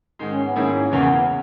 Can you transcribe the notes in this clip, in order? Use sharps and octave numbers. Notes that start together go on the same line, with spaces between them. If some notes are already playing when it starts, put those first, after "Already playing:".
G#2 D#3 G#3
C#4
B3
G#2 D#3 A#3 C#4 E4 G#4
E2 C#3 E3 A#3 B3 C#4